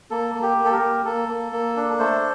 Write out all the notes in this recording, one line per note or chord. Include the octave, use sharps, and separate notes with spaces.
A#3 A4
A#3
G4
A#3
A4
G4 A#4
A#3
A#3 A4
A#3
A#3
D4
A3 A4 C5